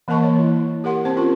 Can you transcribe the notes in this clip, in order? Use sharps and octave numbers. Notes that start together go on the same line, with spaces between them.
E3 A#3 A#4 D#5 A5 C#6
C#5
E4
G4 A#4 F#5 C6
C4 C5 A5
C#4 F4 A#4 C6